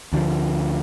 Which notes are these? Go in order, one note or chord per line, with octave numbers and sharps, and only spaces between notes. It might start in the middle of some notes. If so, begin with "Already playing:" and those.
D2 D3 E3 F3